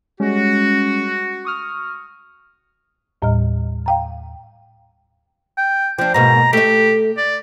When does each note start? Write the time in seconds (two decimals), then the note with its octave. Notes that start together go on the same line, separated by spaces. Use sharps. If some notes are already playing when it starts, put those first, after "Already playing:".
0.20 G3 G#3 C#4 F#4
1.45 C#6 D#6 F6
3.22 D#2 A2 G3 D#5 F6
3.86 F5 G5 A#5
5.58 G5
5.98 F3 D4 G5
6.14 G#2 B2 A#3 A#5
6.53 A3 G4 E5
7.18 D5